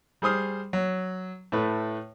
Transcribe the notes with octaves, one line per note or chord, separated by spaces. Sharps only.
G3 G#4 C5 D#6 F6
F#3
A2 A3 B4